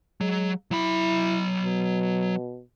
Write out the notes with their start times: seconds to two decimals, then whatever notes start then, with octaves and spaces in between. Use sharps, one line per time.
0.21 F#3 G#3
0.71 F#3 E4 B5
1.65 B2